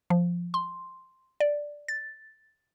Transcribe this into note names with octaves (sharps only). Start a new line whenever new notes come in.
F3
C6
D5
A6